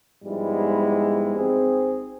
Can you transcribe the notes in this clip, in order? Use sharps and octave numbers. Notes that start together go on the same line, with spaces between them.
G#2 F3 G3 G#3 B3 E4
G#1 C4 G#4